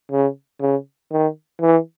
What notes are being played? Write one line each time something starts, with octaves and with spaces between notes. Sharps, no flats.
C#3
C#3
D#3
E3